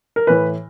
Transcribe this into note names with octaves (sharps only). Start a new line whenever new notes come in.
A#4
A2 E3 B4